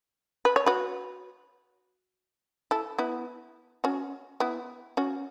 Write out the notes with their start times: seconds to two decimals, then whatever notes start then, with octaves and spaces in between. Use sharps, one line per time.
0.45 B4
0.56 C#5
0.66 F#4 B4
2.71 E4 A4
2.98 B3 E4
3.84 C#4 F#4
4.40 B3 E4
4.97 C#4 F#4